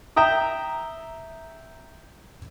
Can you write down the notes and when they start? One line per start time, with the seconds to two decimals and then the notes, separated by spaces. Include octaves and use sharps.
0.16 E5 G5 A#5 D#6